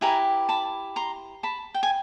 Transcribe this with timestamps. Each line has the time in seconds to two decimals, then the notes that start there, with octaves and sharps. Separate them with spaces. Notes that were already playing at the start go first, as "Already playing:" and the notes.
0.01 E4 G4 B4 G#5 A#5
0.49 A5 B5
0.96 A#5 C6
1.43 A5 B5
1.74 G5
1.83 G#5